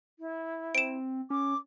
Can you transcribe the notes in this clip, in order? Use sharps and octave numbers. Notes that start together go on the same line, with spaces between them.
E4
C4 D7 E7
C#4 D6